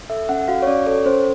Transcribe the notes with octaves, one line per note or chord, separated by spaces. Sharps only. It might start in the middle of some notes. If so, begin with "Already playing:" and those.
A4 E5
C#4 F#5
F#4 F5
C#5
C#4 D5
A4 C#5
C#4 C5